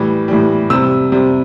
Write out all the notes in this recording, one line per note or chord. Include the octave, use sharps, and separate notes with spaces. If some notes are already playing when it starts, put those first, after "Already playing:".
Already playing: A2 E3 G3
A2 E3 G3
C3 G3 E6
C3 G3